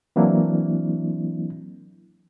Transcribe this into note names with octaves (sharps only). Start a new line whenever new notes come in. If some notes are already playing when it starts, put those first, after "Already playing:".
E3 F#3 A#3 C4 D4 E4